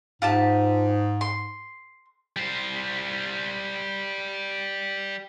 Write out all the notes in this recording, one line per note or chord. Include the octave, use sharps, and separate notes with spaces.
G#2 F4 G4 A5
C6
G3 C5